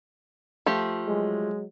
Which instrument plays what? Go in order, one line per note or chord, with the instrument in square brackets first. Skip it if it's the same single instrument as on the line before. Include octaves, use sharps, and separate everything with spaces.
[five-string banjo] F3 A3 G4
[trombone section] F#3 G#3